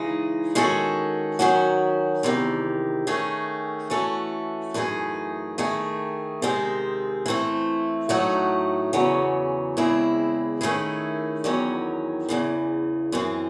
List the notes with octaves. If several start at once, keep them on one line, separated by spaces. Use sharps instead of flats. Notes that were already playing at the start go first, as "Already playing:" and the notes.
Already playing: C#3 E3 G#3 D#4
D#3 G#3 C#4 F#4 A4
D#3 F#3 C#4 F#4
E2 C3 D#3
D#3 A3 C#4 G#4
E3 A3 C#4 F#4 A4
F#2 E3 A3 D#4 G#4
D#3 A3 D#4 G#4
C3 D#3 G#3 C4
E3 A3 C4
A2 F#3 A3 D#4 F#4
E2 C#3 F#3 C#4
E2 C#3 G#3 C4 E4
D#3 A3 C#4 E4 G#4
E2 D#3 F#3 C#4
E2 C#3 E3
F#2 E3 C4